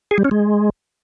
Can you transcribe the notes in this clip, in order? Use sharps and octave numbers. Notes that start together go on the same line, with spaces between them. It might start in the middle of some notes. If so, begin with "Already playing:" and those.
G#4
G3
C#4
G#3